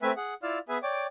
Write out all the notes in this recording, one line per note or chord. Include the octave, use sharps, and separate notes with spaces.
A3 C4 B4 E5 G#5
G#4 F#5
E4 F4 D5 F5 E6 F6
B3 G#4 B4 E5 G#5
C#5 D5 G5 D6